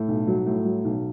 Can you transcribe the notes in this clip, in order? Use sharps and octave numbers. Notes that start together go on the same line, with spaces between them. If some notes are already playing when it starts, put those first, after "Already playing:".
Already playing: A2
B1
F#3
A2
F#3
B1